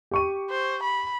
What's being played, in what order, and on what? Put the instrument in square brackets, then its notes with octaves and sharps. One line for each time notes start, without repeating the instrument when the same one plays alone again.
[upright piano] G4 C#6 D#7
[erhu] C5
B5